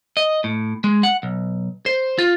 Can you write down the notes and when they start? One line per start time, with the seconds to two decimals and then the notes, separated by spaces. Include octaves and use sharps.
0.17 D#5
0.44 A2
0.84 G#3
1.03 F#5
1.23 B1
1.86 C5
2.18 F4